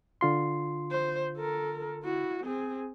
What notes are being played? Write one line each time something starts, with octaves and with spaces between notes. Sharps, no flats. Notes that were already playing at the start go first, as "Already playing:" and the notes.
D3 F4 C6
C5
A4 A#4
E4 F#4
C4 G#4